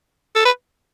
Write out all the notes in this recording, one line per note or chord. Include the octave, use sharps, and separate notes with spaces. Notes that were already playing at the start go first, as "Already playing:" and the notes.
A4
B4